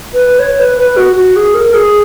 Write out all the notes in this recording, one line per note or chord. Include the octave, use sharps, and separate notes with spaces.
B4
C#5
B4
B4
F#4
F#4
G#4
A#4
G#4